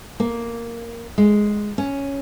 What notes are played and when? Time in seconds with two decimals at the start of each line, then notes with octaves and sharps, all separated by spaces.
0.20 A#3
1.18 G#3
1.78 C#4